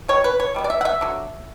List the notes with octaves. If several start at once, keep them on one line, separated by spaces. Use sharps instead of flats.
B2 G3 C#5
B4
C#5
B2 G3 B3
D5
E5
F#5
E5
D3 F#3